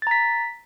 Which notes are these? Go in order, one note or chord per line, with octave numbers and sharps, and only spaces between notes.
A#5 A6 B6